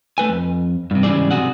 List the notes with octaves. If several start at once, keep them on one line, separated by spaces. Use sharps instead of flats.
A3 B4 G#5
F2
G2 C3
G#2 C#3 E3 G3 G#4 D5
B1 C3 F#4 G#4 F#5